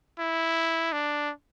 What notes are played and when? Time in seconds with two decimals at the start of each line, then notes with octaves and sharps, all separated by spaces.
0.19 E4
0.93 D4